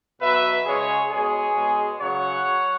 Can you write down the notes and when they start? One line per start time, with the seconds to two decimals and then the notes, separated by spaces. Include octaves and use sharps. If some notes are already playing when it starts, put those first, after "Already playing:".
0.20 B2 F#3 B4 E5
0.66 C#3 G#3 G#4 C#5
1.11 B2 G#3 G#4 C#5
1.56 B2 G#3
2.01 C#3 F#3 C#5 F#5
2.46 F#3